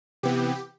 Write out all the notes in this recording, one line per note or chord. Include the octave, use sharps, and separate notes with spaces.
C3 E3 B3 G4